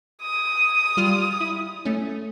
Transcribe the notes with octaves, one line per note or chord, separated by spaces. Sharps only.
D#6
G3 F4 F6
E4
A3 C#4